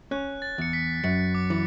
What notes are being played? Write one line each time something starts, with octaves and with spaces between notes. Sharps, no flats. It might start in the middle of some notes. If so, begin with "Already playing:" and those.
C#4 F#6
A6
E2 C#7
B6
B6
F#2 C#7
D6
E3